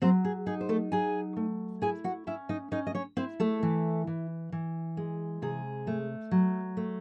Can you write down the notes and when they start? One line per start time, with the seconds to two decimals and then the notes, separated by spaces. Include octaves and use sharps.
0.02 F#3 C4 C5
0.25 G#4
0.46 D#4 G#4
0.61 C5
0.69 A3 A4
0.92 F#3 G#4 G#5
1.37 A3
1.82 E4 G#4 G#5
2.04 F#4 F#5
2.27 C#4 E4 E5
2.49 D#4 D#5
2.72 C#4 D#4 D#5
2.87 D#5
2.95 C#4 C#5
3.17 C4 E4 C5
3.40 A3 A4
3.63 E3
4.07 E3
4.52 E3
4.97 G#3
5.42 C3 G#4
5.87 A3
6.31 F#3
6.77 A3